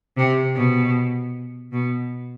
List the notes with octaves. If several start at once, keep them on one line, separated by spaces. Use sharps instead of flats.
C3
B2
B2